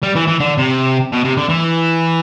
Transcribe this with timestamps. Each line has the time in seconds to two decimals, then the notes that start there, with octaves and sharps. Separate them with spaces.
0.03 G3
0.15 E3
0.28 E3
0.40 D3
0.58 C3
1.13 B2
1.25 C3
1.37 D3
1.49 E3